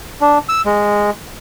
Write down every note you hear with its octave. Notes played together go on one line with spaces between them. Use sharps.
D4
E6
G#3